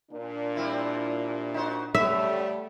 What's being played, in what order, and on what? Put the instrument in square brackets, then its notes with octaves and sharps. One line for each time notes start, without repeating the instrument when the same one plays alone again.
[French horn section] A#2 D4
[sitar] G3 C4 E4
D#4 F#4 C5
[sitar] C#3 B3 C#5 [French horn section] G3 A3 [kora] E5